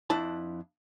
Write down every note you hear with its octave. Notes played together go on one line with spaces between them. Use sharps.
F2 D4 E4 A5